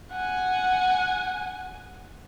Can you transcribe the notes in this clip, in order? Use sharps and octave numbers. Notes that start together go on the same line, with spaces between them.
F#5 G#5